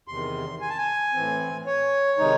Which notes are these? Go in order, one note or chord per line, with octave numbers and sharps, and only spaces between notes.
E2 C3 D#3 C6
G#5
A5
G#5
A2 E3 C4
C#5
C3 D#3 G#3 D#4